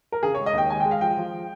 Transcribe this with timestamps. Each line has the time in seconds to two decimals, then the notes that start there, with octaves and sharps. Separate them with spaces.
0.12 A#4
0.23 C#3 G#4
0.35 C#5
0.39 G#3
0.46 D#5
0.54 D#2 G5
0.70 G#3 G#5
0.80 G#3 G5
0.91 F5
1.01 F3 G5
1.17 F3